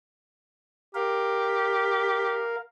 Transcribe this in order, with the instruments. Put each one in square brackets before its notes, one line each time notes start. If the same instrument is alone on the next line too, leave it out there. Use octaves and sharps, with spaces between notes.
[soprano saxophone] G4 [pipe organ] A#4 F5